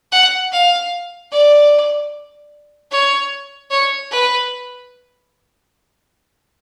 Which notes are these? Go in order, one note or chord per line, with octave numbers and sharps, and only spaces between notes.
F#5
F5
D5
C#5
C#5
B4